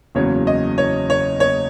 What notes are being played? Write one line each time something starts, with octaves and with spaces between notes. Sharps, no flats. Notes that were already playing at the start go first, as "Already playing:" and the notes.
F#1 E2 C#3 F#3 C#5
D#5
C#5
C#5
C#5